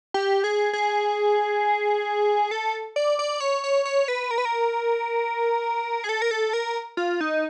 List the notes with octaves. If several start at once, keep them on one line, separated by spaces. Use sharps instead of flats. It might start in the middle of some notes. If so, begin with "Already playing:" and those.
G4
G#4
G#4
A4
D5
D5
C#5
C#5
C#5
B4
A#4
B4
A#4
G#4
A4
A#4
A4
A#4
F4
D#4